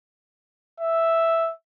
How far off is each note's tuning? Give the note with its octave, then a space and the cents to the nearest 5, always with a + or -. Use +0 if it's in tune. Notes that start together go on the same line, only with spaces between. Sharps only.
E5 +0